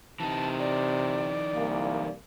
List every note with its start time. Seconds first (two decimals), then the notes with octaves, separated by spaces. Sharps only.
0.20 C3 E3 D#4 A5
0.59 D5
1.55 C2 A#3